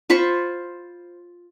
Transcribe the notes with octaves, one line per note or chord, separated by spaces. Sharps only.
F4 C5 B5 C#6